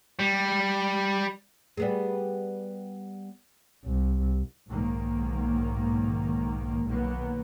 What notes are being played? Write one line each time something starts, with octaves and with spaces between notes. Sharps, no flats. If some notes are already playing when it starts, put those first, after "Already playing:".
G3
G3 B3 G#4
C2
B1 G#2 D#3 A#3
B1 D#3 A#3 B3